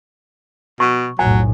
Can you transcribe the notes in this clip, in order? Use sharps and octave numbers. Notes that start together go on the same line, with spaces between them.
B2 C#6
F1 B1 A2 F#3 G#5